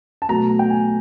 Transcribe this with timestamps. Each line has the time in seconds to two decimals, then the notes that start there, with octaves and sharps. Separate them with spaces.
0.22 A5
0.29 B2 F#3 A3 A#5
0.59 G5
0.70 G#5